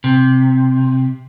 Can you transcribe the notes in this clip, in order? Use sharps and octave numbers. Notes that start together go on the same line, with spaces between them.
C3